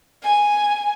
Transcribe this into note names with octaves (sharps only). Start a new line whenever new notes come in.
G#5